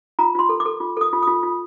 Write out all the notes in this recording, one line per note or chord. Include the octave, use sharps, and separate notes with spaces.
F4 A#5
F4 C6
A4
D6
A4
F4
A4 D#6
F4
D#6
F4
F4